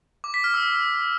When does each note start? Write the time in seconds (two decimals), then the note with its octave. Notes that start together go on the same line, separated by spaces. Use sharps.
0.24 D6
0.34 B6
0.44 F6
0.54 E6